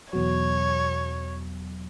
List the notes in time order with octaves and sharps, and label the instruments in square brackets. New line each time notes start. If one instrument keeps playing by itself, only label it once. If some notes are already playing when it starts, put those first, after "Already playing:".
[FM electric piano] E2 B2 F#3 [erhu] C#5